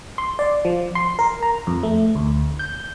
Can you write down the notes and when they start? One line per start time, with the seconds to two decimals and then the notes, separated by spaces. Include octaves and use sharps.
0.18 C6
0.39 D5
0.65 F3
0.95 C6
1.19 A#4
1.43 A#5
1.67 F2
1.83 A3
2.15 D2
2.59 G6